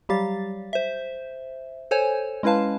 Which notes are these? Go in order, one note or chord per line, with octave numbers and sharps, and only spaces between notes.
F#3 G3 G4 F5 A6
C5 E5
A4 C5 C#5 G#5
G#3 C#4 E4 B4 F5 A5